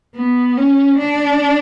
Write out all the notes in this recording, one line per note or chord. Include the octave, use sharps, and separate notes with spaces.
B3
C#4
D4